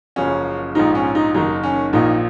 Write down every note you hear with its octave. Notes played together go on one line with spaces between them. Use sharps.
F#1 F#2 C#3 F3 C#4
A#1 G#2 F3 D#4
C#4
D#4
F#1 F#2 D#3 D#4
C#4
A#1 A#2 F3 D#4